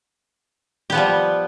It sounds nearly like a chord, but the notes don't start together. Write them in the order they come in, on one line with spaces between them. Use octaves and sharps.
G4 B3 F3 G3